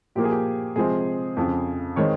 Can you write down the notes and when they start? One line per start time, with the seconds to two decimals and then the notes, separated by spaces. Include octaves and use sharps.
0.15 A#2 F3 A#3 G4
0.24 G#4
0.31 G4
0.76 C3 F3 G#3 C4 G#4
1.37 F2 C#3 F3
1.96 D#3 G#3 C4 C#5